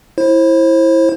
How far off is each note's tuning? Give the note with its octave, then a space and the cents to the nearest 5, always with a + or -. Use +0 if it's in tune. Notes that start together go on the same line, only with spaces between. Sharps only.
E4 +0 C5 +30